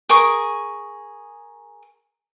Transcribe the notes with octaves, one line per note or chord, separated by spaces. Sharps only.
G#4 A#4 C#6 D#6